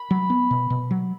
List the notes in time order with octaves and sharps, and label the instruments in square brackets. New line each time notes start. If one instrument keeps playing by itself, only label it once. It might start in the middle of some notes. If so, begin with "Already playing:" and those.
Already playing: [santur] B5
[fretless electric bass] F#3
B3
B2
B2
F#3